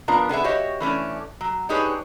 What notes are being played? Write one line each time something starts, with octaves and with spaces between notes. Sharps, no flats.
F3 B3 D4 F4 A#4
D3 B3 G#4 E5
F#4 G4 C#5 D#5 E5
E3 A3 C#4 D4
F#3
D4 D#4 G4 G#4 B4 C#5